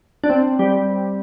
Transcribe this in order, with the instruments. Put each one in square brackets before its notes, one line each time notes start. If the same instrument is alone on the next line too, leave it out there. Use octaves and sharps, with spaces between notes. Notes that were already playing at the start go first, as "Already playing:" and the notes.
[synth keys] D4
C4
G3